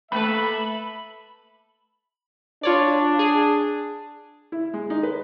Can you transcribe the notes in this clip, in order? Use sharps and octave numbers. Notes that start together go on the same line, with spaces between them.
A3 A#3 A4 B4 E5 B5
D4 F4 C#5 D5
G#4
E4
G#3
D#4
B4